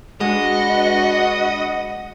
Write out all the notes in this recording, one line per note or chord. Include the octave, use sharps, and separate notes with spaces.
G#3 D4 F#4 B4 D#5 F#5